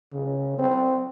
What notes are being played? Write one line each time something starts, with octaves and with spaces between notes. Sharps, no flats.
C#3
C4